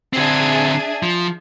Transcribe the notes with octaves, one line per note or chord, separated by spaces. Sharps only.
D3 C4 D4 G#4 E5
F3